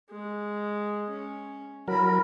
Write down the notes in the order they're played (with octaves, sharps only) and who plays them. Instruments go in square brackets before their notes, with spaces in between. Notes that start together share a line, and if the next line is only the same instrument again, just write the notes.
[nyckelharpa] G#3
C#4
[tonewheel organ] F#3 A#4 [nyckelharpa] E4 B5